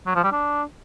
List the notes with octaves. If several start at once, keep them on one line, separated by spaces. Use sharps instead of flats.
F#3
F3
G3
D4